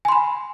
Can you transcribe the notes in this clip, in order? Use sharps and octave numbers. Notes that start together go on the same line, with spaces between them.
G#5 B5 C6